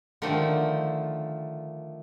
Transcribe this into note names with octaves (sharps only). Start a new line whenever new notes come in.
D3 D#3 F3 A3 G5